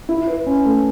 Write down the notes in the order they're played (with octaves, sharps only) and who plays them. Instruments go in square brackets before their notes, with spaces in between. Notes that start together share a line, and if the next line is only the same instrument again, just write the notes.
[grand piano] E4
B4
C#4
A3